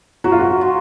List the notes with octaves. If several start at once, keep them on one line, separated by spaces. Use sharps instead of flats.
F#3 F#4
F4
F#4
F4